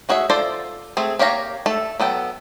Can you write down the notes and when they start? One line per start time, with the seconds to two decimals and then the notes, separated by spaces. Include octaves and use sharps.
0.09 A3 F#4 G#4 C#5 E5
0.30 F4 A4 C5 D5
0.97 A3 C4 G#4
1.19 A#3 G4 C#5 F5 A#5
1.66 A3 A4
2.00 F#3 B3 A4 G5